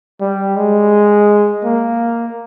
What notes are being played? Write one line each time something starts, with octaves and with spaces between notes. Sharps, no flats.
G3
G#3
A#3